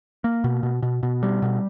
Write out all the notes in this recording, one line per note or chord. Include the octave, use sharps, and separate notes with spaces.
A#3
B2
B2
B2
B2
G3
B2